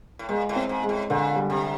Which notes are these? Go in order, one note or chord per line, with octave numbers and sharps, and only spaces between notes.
A2
A#2 G#3
A2
C4
G#2
G#3
A2
A#2 D3
G3
C3